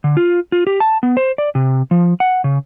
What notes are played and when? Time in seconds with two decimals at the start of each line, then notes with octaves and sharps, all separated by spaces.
0.04 D3
0.17 F4
0.52 F4
0.67 G4
0.80 A5
1.03 B3
1.17 C5
1.38 D5
1.55 C3
1.91 F3
2.20 F#5
2.44 C#3